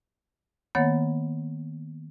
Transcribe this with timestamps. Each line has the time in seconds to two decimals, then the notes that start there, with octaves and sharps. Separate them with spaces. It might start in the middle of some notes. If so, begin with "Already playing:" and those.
0.75 D#3 A#3 B3 C#5 F#5 A6